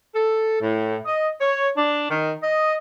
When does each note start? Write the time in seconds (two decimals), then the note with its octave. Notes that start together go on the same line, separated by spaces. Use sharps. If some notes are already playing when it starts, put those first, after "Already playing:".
0.15 A4
0.62 A2
1.06 D#5
1.41 C#5
1.77 D4
2.10 D#3
2.43 D#5